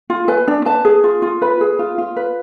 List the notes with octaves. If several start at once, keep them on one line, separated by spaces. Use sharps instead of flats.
F4
B4 G#5
D4
B4 A5
G#4
F4
F4
B4 B5
G#4
F4
F4
B4